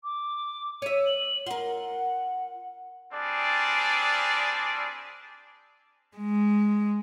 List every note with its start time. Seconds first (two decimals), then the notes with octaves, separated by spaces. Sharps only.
0.04 D6
0.82 C#5 E5 D#7
1.05 F#7
1.46 F4 A#4 F#5
3.13 G3 C4 D4 G#4 D5
6.17 G#3